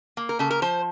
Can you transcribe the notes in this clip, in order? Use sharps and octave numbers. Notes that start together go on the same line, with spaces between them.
A#3
A#4
C#3 A4
A#4
F3 C5